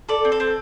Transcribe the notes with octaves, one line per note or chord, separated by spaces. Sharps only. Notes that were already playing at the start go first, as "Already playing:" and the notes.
A4 D5
C4
A4
C4